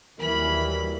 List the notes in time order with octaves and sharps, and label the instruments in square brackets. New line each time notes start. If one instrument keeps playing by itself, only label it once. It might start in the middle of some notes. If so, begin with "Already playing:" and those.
[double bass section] D#2 G3 [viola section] E3 F#3 E4 [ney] A#4 [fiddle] B5